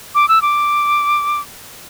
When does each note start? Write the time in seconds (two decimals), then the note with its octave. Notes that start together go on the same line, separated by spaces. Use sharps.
0.15 D6
0.29 E6
0.42 D6